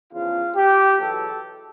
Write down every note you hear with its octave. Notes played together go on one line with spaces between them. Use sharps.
E2 C#3 F3 F4
G4
E2 B2 F#3 A4